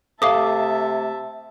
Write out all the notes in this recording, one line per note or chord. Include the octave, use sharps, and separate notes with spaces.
C3 A3 E5 F5 A5 D6 D#6